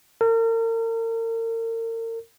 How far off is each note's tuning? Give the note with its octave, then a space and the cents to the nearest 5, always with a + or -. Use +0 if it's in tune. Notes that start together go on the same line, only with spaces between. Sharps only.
A#4 -40